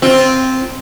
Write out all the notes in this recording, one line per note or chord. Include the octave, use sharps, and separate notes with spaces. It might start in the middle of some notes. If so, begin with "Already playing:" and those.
C4 F4